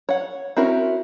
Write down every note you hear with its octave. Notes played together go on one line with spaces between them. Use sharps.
C#5 F#5
C4 C#4 E4 F#4 A#4